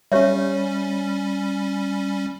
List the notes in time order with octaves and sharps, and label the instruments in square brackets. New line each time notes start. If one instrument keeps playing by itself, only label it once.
[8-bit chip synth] G3 C#4 [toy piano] G4 C#5 E5